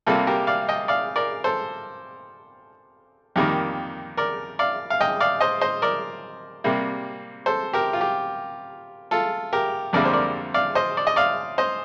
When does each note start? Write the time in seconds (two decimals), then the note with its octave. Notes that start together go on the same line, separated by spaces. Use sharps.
0.06 C3 G3 A#3 F4 A4
0.27 G4 A#4
0.47 D5 F5
0.69 D#5 G5
0.88 D5 F5
1.16 A#4 D5
1.44 A4 C5
3.36 F2 D#3 G3 A#3 G4
4.17 A#4 D5
4.59 D5 F5
4.90 F5
5.01 D#5 G5
5.20 D5 F5
5.40 C5 D#5
5.61 C5 D#5
5.82 A#4 D5
6.64 C3 G3 A#3
7.46 A4 C5
7.73 G4 A#4
7.93 F4
8.01 G4
9.11 F4 A4
9.53 G4 A#4
9.93 F2 D3 G3 A#3 A#4 D5
10.05 C5
10.13 A#4 D5
10.54 D5 F5
10.75 C5 D#5
10.97 D5
11.07 D#5
11.16 D5 F5
11.58 C5 D#5